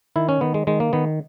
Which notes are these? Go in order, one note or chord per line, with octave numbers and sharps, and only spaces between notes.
D#3 E4
C#4
D#3 B3
G#3
D#3 G#3
A#3
D#3 B3